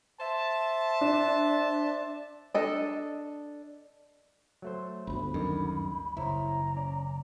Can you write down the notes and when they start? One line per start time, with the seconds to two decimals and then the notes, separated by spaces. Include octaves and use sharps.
0.20 C5 E5 A5
1.01 D4
2.54 D4 A4 D#5
4.62 F#3 A3 C5
5.07 G1 D2 B5
5.34 F#2 D3 D#3
6.17 F#1 E4 C5 C#5 A#5
6.76 C#4 D5